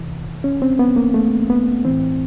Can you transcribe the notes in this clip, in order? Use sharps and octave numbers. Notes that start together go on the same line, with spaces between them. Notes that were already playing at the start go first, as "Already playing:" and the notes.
Already playing: F2 C3 E3
C#4
C4
B3
A#3
A3
B3
A2 E3 C4